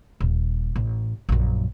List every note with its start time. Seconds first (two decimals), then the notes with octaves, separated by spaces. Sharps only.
0.20 D#1
0.76 A1
1.29 A#1 F#2